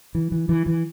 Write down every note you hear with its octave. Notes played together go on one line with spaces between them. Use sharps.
E3
E3
E3
E3